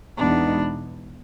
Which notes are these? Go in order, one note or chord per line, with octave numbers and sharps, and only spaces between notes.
E2 B2 G#3 B3 D4 D#4